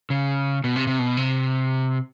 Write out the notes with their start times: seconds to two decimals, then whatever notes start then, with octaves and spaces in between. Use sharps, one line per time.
0.10 C#3
0.64 B2
0.76 C3
0.87 C3
0.99 B2
1.17 C3